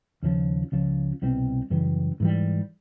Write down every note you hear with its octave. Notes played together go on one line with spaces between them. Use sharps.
D#2 C#3 F3
C#2 C#3 F3
C2 B2 G3 C4
F#2 C#3 E3 G3
G#2 E3 G3